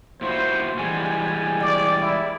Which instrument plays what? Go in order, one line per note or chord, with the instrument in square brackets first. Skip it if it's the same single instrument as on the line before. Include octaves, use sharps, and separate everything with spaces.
[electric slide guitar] A#2 E4 F#4 [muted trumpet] C5
[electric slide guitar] E3 G3 G#3 [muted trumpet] G#5
[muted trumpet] D5
E4